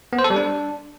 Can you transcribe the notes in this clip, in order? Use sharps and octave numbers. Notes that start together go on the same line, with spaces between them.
B3
C5
A4
G3
D4